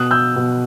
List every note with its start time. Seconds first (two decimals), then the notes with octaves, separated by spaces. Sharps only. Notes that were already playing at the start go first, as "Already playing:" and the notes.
Already playing: B2 D#6 F#6
0.11 E6 G6
0.36 B2